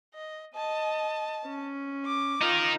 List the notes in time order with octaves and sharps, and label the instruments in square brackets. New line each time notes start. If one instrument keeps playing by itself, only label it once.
[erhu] D#5
[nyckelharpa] D#5 [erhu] A5
[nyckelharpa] C#4
[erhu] D6
[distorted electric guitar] D#4 A#4 [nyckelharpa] F4